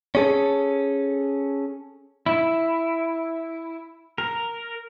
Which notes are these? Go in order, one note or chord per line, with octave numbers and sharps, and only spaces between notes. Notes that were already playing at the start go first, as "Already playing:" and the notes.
C#4 G#4 A4
E4
A#4